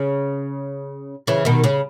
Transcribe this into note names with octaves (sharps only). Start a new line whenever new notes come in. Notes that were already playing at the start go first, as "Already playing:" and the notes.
Already playing: C#3
C#3 E3
B2 D#3
C#3